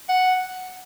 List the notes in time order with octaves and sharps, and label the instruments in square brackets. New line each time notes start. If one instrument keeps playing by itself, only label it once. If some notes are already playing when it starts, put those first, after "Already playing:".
[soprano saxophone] F#5